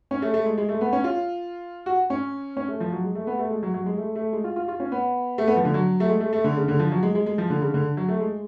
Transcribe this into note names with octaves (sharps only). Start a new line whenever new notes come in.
C#4
A3
A3
G#3
G#3
A3
B3
C#4
F4
F#4
C#4
C#4
A3
F3
F#3
G#3
A3
B3
A3
G#3
F#3
F#3
G#3
A3
A3
G#3
F4
F4
F4
C#4
B3
A3
B3
F3
D3
F#3
A3
G#3
A3
A3
D3
C#3
D3
F3
F#3
G#3
G#3
G#3
F3
D3
C#3
D3
F#3
A3
G#3